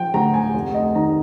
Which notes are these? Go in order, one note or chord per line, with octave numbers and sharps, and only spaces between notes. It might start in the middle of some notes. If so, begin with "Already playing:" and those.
Already playing: F3 G5
D2 A#5
G#5
F1
D#5
D#3 A#5